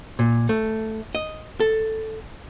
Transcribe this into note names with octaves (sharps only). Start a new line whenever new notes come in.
A#2
A3
D#5
A4